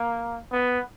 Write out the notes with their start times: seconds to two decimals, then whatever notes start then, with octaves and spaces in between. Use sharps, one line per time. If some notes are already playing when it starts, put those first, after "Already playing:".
Already playing: A#3
0.52 B3